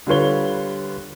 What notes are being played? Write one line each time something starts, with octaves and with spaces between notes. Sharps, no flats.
D3 G3 F4 B4 C#5 G7